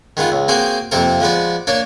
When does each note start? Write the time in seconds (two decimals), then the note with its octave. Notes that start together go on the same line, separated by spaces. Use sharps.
0.17 D#3 G#3 B3 F4
0.32 C#2
0.48 A#3 C4 F#4 G#4 C5 G5
0.91 F2 C3 A#3 A4 A#4
1.20 F3 G#3 B3 D5
1.67 A#3 D4 C#5 D5